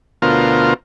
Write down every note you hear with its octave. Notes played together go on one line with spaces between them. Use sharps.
D2 B2 F4 A#4 C5